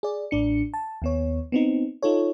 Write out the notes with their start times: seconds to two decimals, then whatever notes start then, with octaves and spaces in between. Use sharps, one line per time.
0.03 G#4 D5
0.31 A1 A2 D4 C#7
0.74 A5
1.02 D#2 B3 C#5
1.52 B3 C4 D#4
2.02 D#4 F4 A4 C#5